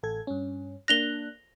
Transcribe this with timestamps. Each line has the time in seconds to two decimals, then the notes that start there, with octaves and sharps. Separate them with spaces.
0.03 A1 A4 G#6
0.27 G2 C#4
0.88 A#3 D4 F#6 A#6 F7 G7